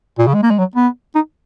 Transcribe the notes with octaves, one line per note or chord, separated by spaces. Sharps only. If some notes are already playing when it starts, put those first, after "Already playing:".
A#2
C#3
G#3
A#3
G#3
F#3
B3
D#4